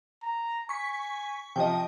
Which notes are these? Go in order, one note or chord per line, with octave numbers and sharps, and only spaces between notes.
A#5
G#5 C#6 B6
C3 F3 D#5 G5